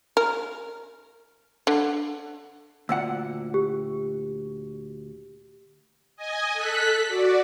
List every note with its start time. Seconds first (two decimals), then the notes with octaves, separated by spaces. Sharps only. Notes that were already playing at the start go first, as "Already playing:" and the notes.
0.17 A#4
1.67 D3
2.89 D2 A#2 F#5 E6
3.54 G4
6.16 D#5 G#5
6.53 A4 F#6 B6
7.07 F#4 D5